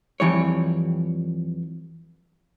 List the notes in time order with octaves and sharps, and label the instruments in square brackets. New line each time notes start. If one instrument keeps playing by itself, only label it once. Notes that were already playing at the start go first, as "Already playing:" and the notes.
[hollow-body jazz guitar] F2 E3 G3 C#5